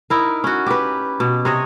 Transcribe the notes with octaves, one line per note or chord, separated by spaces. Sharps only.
D#4 E4 A#4
C#4 F#4
G4 B4
B2
C3 C#5 D#5